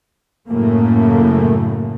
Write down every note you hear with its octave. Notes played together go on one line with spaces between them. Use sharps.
F#2 A2 C#3 A3 A#3